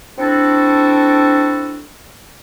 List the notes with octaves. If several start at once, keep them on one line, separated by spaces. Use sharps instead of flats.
C4 D4 E4 F#4 A4